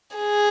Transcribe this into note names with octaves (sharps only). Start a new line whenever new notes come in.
G#4